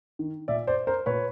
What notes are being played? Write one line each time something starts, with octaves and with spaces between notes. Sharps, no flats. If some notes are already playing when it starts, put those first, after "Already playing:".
D#3
A#2 D5 E5
C5 D5
A#4 C5
A#2 B4 C#5